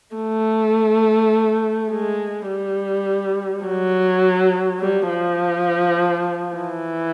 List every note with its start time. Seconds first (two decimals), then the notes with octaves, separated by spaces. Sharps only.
0.16 A3
1.90 G#3
2.48 G3
3.64 F#3
4.80 G3
5.09 F3
6.55 E3